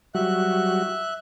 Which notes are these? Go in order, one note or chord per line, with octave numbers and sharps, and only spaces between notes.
F#3 G3 F#4 E5 F#6